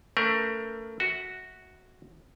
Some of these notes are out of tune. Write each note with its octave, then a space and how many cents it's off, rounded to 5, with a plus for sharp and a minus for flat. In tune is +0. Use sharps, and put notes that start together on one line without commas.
A3 +30 C#4 +35 A#4 +30
F#4 +0 E5 -25